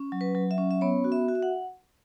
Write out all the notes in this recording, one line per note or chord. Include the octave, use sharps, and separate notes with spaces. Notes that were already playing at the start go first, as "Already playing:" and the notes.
Already playing: C#4
F#3
B4
F#3
E5
C#4
E5
B3 C#5
F#4
E5
F#4
E5
F#5